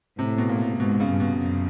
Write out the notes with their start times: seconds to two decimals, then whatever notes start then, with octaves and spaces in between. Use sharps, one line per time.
0.19 A2 C3
0.38 B2
0.49 A#2
0.79 G#2 B2
1.00 C#3
1.10 G2
1.20 B2
1.40 F#2